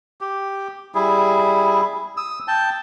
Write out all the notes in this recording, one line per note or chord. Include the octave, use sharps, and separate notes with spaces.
G4
G3 E4 G#4
D#6 E6
G5 A5